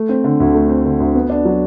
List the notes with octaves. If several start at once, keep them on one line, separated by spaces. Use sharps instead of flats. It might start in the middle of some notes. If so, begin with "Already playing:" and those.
Already playing: A3
C4
D3
D2
A3
C4
D3
D2
B3
D4
F#3